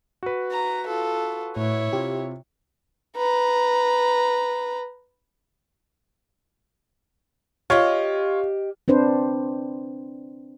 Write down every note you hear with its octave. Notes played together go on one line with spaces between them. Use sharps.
F#4 B4
A#5
F4 A4
A2 E4 C#5
C3 F4 G4
B4 A#5
F4 G4 C#5 D#5
C4 D4 B4 C5